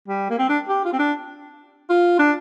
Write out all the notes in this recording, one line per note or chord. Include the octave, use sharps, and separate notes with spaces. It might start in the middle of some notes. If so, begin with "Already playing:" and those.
G3
A#3
C4
D4
G4
F4
C4
D4
F4
D4